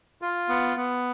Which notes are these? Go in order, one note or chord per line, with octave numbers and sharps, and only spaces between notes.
F4
B3
B3